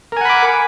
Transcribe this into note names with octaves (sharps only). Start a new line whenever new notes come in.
A#4 F#5 G#5 B5 D6